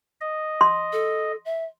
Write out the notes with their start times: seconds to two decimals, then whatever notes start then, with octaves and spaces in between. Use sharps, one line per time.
0.21 D#5
0.61 C6
0.93 A4
1.45 E5